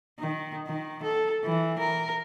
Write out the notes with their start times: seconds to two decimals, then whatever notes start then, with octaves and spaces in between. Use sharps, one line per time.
0.19 D#3
0.67 D#3
1.03 A4
1.44 E3
1.79 A#4